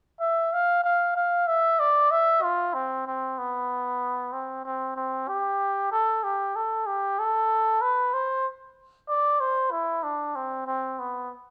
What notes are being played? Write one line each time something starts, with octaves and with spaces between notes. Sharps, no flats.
E5
F5
F5
F5
E5
D5
E5
F4
C4
C4
B3
C4
C4
C4
G4
A4
G4
A4
G4
A4
B4
C5
D5
C5
E4
D4
C4
C4
B3